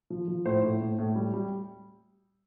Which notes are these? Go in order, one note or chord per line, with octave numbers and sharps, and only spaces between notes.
F3
F3
A2 C5
A2
A2
A2
G3
G3